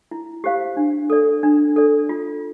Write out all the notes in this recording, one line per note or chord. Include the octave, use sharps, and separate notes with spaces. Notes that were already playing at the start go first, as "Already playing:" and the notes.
E4
G4 C5 F5
D4
A4 D5
D4
A4 D5
F4